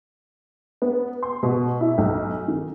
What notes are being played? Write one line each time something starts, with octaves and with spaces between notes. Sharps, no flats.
B3
C6
B2
E4
B1
D#3